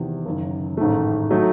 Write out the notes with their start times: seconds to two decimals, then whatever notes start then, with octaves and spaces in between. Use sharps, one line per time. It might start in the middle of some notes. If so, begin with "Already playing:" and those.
Already playing: E2 C3 D#3
0.26 F#1 F#2 D#3
0.77 A1 G#2 D#3 A3
1.30 F#3 A3 D#4